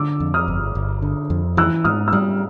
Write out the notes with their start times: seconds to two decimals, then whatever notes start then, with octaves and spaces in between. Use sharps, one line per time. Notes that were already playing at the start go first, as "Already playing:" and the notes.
Already playing: D3 D6 E6
0.20 F2
0.34 D#6 F6
0.48 G1
0.75 G1
1.02 D3
1.30 F2
1.57 E3 E6 F#6
1.84 G#2 D#6 F6
2.08 E6
2.13 G3 D#6 F6